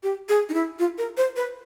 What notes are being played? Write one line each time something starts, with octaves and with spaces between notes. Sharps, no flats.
G4
G#4
D#4
E4
F4
A#4
C5
B4